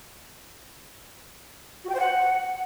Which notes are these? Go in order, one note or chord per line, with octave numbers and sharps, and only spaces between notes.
F#4
G5
C5
F#5